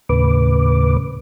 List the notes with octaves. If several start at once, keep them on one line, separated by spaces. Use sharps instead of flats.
D#2 A2 C#3 B4 D6